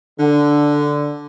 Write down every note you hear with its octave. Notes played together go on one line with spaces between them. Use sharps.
D3